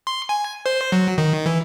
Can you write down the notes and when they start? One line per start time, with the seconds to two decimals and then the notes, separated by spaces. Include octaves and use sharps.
0.07 C6
0.29 G#5
0.66 C5
0.92 F#3
1.18 D#3
1.46 E3